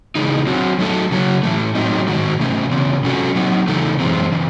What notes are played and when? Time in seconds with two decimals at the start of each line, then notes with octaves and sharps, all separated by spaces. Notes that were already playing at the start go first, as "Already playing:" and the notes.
0.15 C#3 E3 G#3 D#4
0.47 F#3 C4 F#4
0.79 F#3 A3 D#4 F#4 A4
1.12 C#3 F#3 C#4
1.43 A2 E3 A3
1.75 A2 F#3 C4 D#4
2.07 G#2 D#3 G#3 F#4
2.40 C3 E3 A3 C#4
2.71 C#3 E3 C4
3.04 C3 F#3 C#4 F#4 A4
3.35 F#3 C4 D#4
3.67 C#3 E3 A3 D#4 A4
4.00 F#2 E3 G#3 C4
4.32 C#3 E3